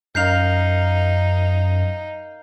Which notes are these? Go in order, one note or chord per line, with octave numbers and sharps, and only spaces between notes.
F#2 D#4 A#4 F5 G6 C7 F7